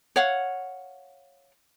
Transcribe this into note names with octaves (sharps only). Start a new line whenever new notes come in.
C#5 F5 F#5